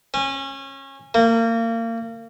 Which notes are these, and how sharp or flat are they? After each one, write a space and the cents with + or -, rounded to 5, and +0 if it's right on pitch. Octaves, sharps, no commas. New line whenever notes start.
C#4 -25
A#3 -30